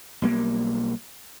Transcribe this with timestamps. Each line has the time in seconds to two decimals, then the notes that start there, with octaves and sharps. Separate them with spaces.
0.22 B1 G3 A#3